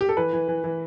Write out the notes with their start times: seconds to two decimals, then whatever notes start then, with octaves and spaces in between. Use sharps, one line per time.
0.01 G4
0.09 A4
0.17 E3 B4
0.33 E3
0.48 E3
0.64 E3